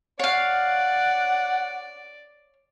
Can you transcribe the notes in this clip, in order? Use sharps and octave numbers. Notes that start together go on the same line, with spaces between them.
C#5 D5 F5 F#5